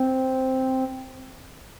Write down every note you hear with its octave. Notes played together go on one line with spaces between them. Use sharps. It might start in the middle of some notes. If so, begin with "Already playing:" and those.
Already playing: C4